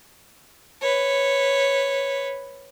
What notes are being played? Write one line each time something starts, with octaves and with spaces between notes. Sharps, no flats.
B4 C#5